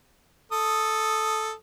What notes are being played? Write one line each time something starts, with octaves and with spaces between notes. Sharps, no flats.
A4 D#6